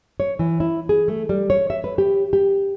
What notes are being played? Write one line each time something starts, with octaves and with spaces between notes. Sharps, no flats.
C#5
E3
E4
G#4
A3
G3
C#5
E5
B4
G4
G4